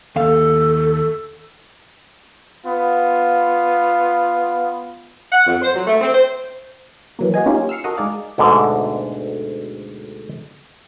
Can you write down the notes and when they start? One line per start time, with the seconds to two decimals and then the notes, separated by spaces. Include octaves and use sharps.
0.16 D#2 A4 F5
2.66 B3 F4
5.32 F#5
5.46 F2
5.62 C5
5.74 F#3
5.87 A3
6.01 C4
6.14 C5
7.19 E3 F#3 A#3
7.34 F#4 G#4 D#5 G#5
7.46 A#3 C#4 D#4 F4 G4
7.69 E6 F6 C7 C#7
7.84 F#4 A4 A#4 D#5 F#5
7.97 G#3 D#4 G#4 D5 F5
8.38 D2 G#2 B2 D3